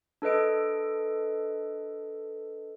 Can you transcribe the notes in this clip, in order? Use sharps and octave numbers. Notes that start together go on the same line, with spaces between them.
D4 A4 B4 D#5 D7